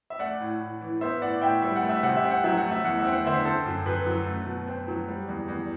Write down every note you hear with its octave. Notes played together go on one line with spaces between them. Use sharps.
E5
A3 D5 F#5
A2
A2
E3
B3 C5 E5
A2 D5 F#5
A2 E5 G5
G3 E5
F#5
A3
E5
C3 F#5
E5
C4
F#5
F#3 E5
F#5
A3
E5
E2 F#5
E5
C4
F#5
D3 C5 E5
C4 A4 C5
F#2
F#2 B4
F#3
A3
B2
C4
F#3
G3
E2
E2